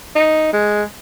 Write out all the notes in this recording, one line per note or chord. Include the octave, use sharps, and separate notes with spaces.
D#4
G#3